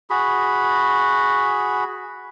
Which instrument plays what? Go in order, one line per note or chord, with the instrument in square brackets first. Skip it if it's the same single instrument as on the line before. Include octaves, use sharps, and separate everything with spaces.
[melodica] F#4 G#4 B5